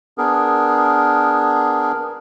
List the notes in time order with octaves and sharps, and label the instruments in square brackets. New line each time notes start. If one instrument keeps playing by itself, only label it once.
[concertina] B3 D4 G#4 A#4